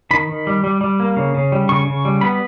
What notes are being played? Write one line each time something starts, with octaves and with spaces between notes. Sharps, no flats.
D#3 B5
D#3
G3
G3
G3
A#3
C#3
C#3
G3
C#3 C#6
C#3
G3
B3 B5